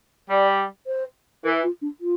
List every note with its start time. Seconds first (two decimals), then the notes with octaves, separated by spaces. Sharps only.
0.30 G3 D5
0.87 C5
1.44 E3 A#4
1.63 F4
1.81 D4
2.00 F4